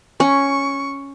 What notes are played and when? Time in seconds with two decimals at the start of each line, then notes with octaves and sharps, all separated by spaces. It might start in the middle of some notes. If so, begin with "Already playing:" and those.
0.20 C#4 C#6